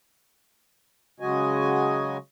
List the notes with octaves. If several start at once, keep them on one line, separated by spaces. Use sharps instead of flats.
C#3 F#3 G#3 F#4 D#5 G#5